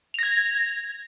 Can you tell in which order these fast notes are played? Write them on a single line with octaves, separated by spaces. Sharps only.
F7 A#6 G#6